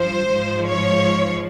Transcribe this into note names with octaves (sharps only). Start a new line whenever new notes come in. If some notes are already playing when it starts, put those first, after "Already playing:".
Already playing: G2 F3 C5
G#2 F3
C#5